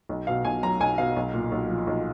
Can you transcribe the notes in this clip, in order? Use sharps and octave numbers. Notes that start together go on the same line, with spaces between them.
B1
B2 F5
B1 G#5
F#3 A#5
B1 G#5
B2 F5
B1
A#2
B1
F3
B1